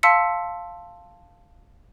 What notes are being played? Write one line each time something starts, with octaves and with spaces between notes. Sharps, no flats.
F5 A5 C6 E6 B6 C#7